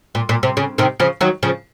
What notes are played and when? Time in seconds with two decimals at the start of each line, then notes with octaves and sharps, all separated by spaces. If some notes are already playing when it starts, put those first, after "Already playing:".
0.15 A#2
0.29 A#2
0.43 C3
0.57 C#3
0.78 C3 D#3
1.00 C#3 F3
1.21 D#3 F#3
1.43 C#3 F3